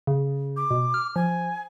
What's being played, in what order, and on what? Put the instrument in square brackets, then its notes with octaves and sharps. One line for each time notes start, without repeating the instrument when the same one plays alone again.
[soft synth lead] C#3
[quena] D6
[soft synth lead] B2
F6
[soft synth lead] F3 [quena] G#5